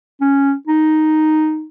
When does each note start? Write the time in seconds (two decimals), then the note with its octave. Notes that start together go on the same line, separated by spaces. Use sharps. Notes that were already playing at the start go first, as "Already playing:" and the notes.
0.21 C#4
0.68 D#4